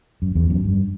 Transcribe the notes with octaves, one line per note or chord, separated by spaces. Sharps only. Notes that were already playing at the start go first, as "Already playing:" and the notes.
F#2
E2
F#2
G2